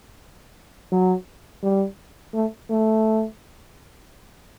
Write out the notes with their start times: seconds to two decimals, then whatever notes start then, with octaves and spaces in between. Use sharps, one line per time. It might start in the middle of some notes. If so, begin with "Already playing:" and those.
0.92 F#3
1.63 G3
2.34 A3
2.70 A3